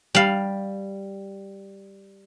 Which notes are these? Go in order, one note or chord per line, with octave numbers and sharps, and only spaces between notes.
G3 F5